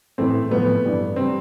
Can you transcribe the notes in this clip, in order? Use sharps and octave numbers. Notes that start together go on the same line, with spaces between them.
A2 E3 A3 C4
A2 F3 A3 B3
G2 E3 G3
C3 G3 C4